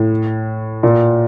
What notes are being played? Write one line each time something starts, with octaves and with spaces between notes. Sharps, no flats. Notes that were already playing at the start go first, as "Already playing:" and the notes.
Already playing: A2
A#2